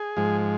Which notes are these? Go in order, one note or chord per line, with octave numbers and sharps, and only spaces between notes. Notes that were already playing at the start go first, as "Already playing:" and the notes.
Already playing: G#4
G#2 F3 G#3